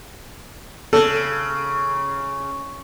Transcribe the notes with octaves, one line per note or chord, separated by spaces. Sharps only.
C#3 A4